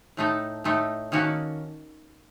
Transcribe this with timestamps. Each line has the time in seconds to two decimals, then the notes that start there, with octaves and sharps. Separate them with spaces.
0.17 A2 A3 D#4 A4
0.64 A2 A3 D#4 A4
1.12 D#3 A#3 C#4 F#4 A4